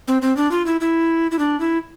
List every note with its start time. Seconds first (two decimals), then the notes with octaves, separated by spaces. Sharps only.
0.08 C4
0.22 C4
0.37 D4
0.51 F4
0.66 E4
0.81 E4
1.31 E4
1.39 D4
1.60 E4